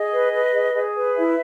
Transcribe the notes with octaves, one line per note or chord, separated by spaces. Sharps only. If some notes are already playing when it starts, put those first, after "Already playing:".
Already playing: G#4 D#5
B4
B4
G#4
G#4
B4
E4 E5